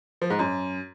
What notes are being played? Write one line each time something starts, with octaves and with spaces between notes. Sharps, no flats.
F3
G#2
F#2